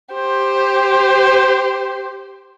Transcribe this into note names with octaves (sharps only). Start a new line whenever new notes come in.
G4 C5